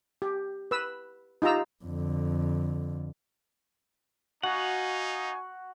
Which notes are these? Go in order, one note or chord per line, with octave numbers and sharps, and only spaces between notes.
G4
B4 E6
D#4 F4 G4 A#5 E6
F2 D3
D#4 F#4 D#5 F5 F#5 G#5